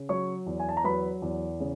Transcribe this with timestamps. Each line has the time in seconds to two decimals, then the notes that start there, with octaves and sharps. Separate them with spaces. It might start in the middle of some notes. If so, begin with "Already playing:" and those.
Already playing: C#3
0.09 F#3 C#5 C#6
0.46 E2
0.59 G#5
0.69 A5
0.77 A#5
0.84 F#3 B4 B5
1.22 E2
1.60 C#3